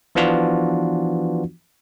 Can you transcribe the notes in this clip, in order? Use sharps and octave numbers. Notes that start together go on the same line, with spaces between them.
E3 F3 B3 D4 F4 F#4